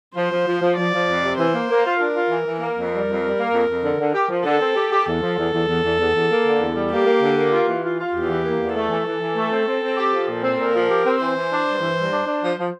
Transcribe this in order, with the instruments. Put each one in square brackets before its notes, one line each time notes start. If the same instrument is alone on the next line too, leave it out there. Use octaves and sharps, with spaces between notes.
[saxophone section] F3 [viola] C5
[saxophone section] F3
F3
F3
[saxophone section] F3 [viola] D5
[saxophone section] F3
F2
C3
[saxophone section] E3 [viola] C5
[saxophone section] A#3
A#3
F4
[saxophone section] D4 [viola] A#4
[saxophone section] F4
E3
E3
[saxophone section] A#3 [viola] A#4
[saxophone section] F2
G3
F2
G3
A#3
F2
F2
D3
D3
G4
F3
[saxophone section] D3 [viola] A4
[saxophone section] C4
G4
G4
[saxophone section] E2 [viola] A4
[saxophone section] F3
E2
E2
E2
E2
E2
E2
A#3
D3
E2
G3
[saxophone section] A#3 [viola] G4
[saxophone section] A#3
D3
A#3
F4
E3
F4
F4
[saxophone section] E2 [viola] G4
[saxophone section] E3
A#3
E2
[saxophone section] A3 [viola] A4
[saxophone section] E3
E3
E3
A3
C4
C4
C4
G4
F3
A#2
C4
[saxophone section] A#2 [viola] A#4
[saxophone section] F3
G4
C4
[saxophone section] E3 [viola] C5
[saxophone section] E3
D4
G2
E3
G2
D4
D4
F3
F3